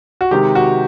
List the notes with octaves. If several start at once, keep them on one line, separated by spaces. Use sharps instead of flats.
F#4
C3 D#3 G#3 G4
F#4